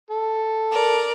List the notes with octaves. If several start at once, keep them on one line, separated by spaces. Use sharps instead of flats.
A4
A#4 D5